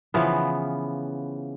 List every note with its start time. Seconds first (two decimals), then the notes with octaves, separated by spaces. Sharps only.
0.14 C#3 E3 F3 B3